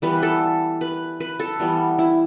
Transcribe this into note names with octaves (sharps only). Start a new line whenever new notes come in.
E3 G3 B3 B4
A4
B4
B4
A4
E3 G3 B3
E4